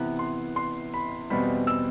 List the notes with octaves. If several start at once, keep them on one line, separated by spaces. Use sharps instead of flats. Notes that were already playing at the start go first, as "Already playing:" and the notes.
Already playing: C3 E3 B3 F#6
C6
C6
B5
E2 B2 G3 C4 B5
E6